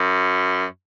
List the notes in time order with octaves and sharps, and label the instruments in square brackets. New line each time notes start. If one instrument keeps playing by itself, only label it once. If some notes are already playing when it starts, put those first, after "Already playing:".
Already playing: [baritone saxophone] F#2